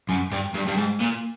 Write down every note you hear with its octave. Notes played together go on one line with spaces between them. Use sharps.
F#2
G2
G2
G2
G#2
A#2